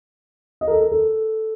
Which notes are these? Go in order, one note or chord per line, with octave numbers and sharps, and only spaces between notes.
D#5
A#4
A4
A#4
A4